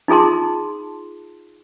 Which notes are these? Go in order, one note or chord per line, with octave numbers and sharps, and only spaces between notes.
D#4 F4 G#4 A5 C6